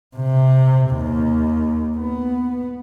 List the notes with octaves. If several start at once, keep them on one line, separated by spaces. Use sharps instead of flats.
C3
D#2
B3